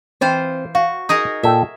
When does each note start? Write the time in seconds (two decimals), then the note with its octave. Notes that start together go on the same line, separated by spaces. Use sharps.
0.21 E3 C4 F4 C5
0.75 F#4 F5
1.09 D#4 G#4 A#4
1.43 A#2 A4 E5 G5